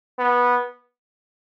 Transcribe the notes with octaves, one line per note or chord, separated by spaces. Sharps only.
B3